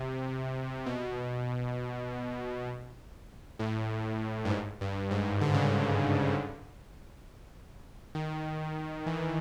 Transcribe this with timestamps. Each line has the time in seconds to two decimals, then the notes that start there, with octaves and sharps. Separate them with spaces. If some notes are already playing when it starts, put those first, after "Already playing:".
Already playing: C3
0.86 B2
3.59 A2
4.45 G2
4.50 G#2
4.81 G2
5.11 G#2
5.41 D3
5.54 C#3
5.66 D3
8.15 D#3
9.06 E3